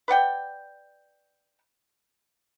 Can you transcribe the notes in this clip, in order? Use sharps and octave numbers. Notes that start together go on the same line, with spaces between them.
B4 D5 F#5 G5